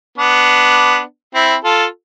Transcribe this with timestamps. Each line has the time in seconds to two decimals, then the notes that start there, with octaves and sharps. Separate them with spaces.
0.18 B3 D4
1.35 C4 E4
1.64 F4 A4